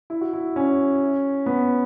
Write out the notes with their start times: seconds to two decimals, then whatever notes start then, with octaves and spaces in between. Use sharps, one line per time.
0.10 E4
0.21 F#4
0.33 E4
0.56 C#4
1.46 B3